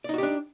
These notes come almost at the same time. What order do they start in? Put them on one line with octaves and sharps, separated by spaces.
D5 D#4 F#4 G4 D4